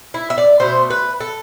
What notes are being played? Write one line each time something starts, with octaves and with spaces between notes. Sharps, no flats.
E4
E5
D5
B2 A3 C5
B4
A4